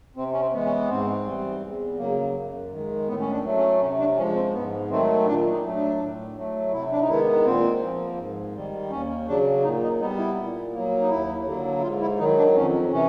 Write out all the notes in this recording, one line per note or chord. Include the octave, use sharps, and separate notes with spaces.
C3 C4
C#4
C4
E3 G#3 B3
C#4
G#2 C4
E3 G3
E2
C#3 F#3 A#3
F#2
D#3
G#3
A2 B3
C#4
D4
F#3 A3
C#4
C3 C#4
D4
F3 G#3 C#4
C4
G#2 B3
D#3 F#3 A3 C4
A#2 D4
D#4
F#3 A3
D4
A2
F#3 A3
C3 E4
D4
D#4
D#3 G#3 B3 E4
A#2 C4
F3 A#3
G#2
D#3 G3
D#2 C#4
C#3 F#3 D4
A#2 D#4
D#4
G3 B3 D#4
E4
A#2
F#3 A#3
D#4
D#2 E4
D3 F#3 A#3
E4
G#2 F4
E4
D#3 F#3 D#4
D4
F2 C#4
C3 E3 C#4